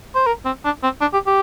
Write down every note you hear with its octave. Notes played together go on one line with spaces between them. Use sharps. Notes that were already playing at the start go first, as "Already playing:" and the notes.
C5
A#4
C4
D4
C4
D4
G4
G4